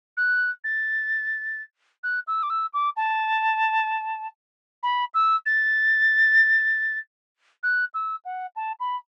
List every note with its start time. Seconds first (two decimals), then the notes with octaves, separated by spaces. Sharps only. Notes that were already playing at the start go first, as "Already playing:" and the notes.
0.17 F#6
0.64 A6
2.03 F#6
2.27 E6
2.43 D6
2.50 E6
2.73 D6
2.96 A5
4.83 B5
5.14 E6
5.46 A6
7.63 F#6
7.94 E6
8.25 F#5
8.56 A5
8.80 B5